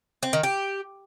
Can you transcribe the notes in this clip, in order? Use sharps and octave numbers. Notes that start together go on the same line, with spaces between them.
C4
D#3
G4